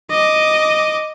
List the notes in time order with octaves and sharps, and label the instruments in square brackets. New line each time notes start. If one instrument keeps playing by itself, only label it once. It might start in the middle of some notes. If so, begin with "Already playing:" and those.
[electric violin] D#5 D6